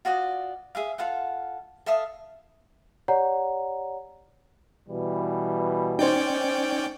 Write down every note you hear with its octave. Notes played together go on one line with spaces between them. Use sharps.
F4 F#4 D5 D#5
G#4 E5 F5
F4 A4 F5 F#5
A4 E5 F5 D#6
G4 C#5 D5 F#5 A#5
B2 E3 G3
C#4 D#4 C5 D5 G5